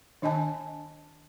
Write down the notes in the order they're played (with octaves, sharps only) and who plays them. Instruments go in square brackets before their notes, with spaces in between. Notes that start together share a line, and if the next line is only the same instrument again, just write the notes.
[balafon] D#3 D4 D#5 G#5 A5